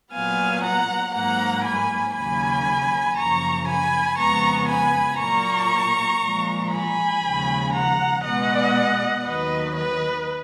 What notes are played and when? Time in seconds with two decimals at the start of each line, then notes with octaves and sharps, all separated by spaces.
0.13 A#2 F#3 B3 F5 G#5
0.63 F#5 A#5
1.13 G#2 F#3 A#3 F#5 A#5
1.64 G#5 B5
2.15 D#2 C#3 F#3 A#3 G#5 B5
3.17 F#2 C#3 F3 A#3 A#5 C#6
3.67 G#5 B5
4.18 F2 C#3 G#3 B3 A#5 C#6
4.69 G#5 B5
5.19 A#2 F#3 A#3 A#5 C#6
6.21 A#2 F3 G#3
6.71 G#5 B5
7.22 D#2 C#3 F3 G#3
7.73 F#5 A#5
8.24 B2 G#3 B3 D#5 F#5
9.25 D#2 D#3 F#3 B4 D#5
9.76 B4 D#5